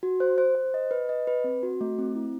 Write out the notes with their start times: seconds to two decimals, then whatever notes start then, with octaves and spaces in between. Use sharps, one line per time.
0.03 F#4
0.20 C5
0.38 C5
0.55 C5
0.74 D#5
0.91 B4
1.09 D#5
1.27 B4
1.44 C4
1.63 F#4
1.81 A3
1.98 C4
2.15 E4